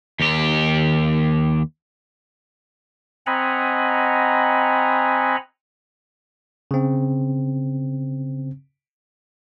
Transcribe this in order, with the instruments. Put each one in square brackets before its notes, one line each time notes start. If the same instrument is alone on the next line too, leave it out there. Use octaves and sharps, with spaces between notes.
[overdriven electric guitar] D#2 G4
[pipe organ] C4 D#5 F#5 G#5 A#5 B5
[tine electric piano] C#3 C4